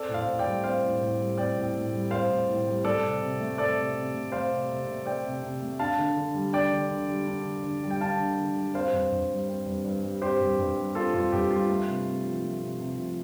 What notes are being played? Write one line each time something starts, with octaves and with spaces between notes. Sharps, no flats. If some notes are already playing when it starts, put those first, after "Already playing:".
Already playing: C4 A4 D5
A2
C5 F5
A2
D5 G5
G3
C4 C5 F5
A2
A2
G3
C4 D5 G5
A2
A2
G3
C4 C5 F5
A2
A2
G3
C4 A4 D5
C3
C3
A3
C4 A4 D5
C3
C3
A3
C4 C5 F5
C3
C3
A3
C4 D5 G5
C3
C3
A3
D4 F5 A5
D3
D3
G3
D4 D5 G5
D3
D3
G3
D4
D3
D3
G3
G5
D4 F5 A5
D3
D3
G3
C4 C5 F5
G2
G2
G3
C4
G2
G2
G3
C4 G4 C5
G2
G2
G3
C4 F4 A4
G2 F4
G2 G4
G3 F4
A3
C3
C3
F3
A3
C3
C3
F3